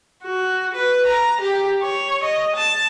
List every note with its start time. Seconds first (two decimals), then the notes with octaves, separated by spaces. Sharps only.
0.23 F#4
0.75 B4
1.06 A#5
1.41 G4
1.83 C#5
2.24 D#5
2.56 A5